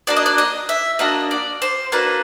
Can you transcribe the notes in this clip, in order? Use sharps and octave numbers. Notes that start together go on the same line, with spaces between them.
A#3 D4 F#4 D5
D#5
D5
D#5
E5
A#3 D4 F#4 D#5
D5
C5
A#3 D4 F#4 B4